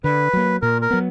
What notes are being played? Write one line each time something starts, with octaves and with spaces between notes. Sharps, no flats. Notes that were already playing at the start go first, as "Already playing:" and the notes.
D3 B4
F#3 A#3
A#2 A#4
A#4
F#3 B3